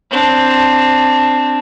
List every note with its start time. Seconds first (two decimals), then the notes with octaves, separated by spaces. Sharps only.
0.11 C4 D4